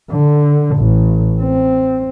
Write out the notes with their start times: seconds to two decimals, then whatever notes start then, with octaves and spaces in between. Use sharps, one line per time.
0.12 D3
0.76 A1
1.41 C4